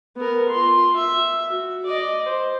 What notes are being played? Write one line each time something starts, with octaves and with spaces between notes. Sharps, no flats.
B3 A#4
F4 C6
E5
F#4
D5 D#5
C5